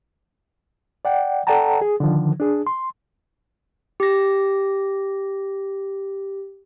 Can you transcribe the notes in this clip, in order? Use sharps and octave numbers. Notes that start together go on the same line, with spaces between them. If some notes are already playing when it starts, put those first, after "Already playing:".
D5 F#5 G5
A4 D5 F#5 G5 A5 A#5
G#4
D3 D#3 F3
D4 G#4
C6
G4 A#6